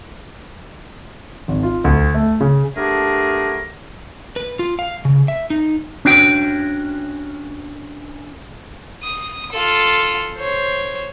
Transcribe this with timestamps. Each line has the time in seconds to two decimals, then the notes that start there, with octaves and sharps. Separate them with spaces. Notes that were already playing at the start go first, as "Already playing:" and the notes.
1.48 G#1
1.63 F4
1.84 D2
2.14 A3
2.41 C#3
2.76 A3 B3 D4 G4 G#4 A#4
4.36 B4
4.59 F4
4.79 F5
5.05 C#3
5.28 E5
5.50 D#4
6.05 C#4 D4 F#4 G5
9.03 D#6
9.53 F4 A4
10.36 C5 C#5